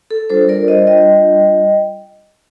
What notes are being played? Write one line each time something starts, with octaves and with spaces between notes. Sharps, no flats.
A4
G3 D4 F4 A4 C5
A#4 D5
C5 D#5
D#5 G5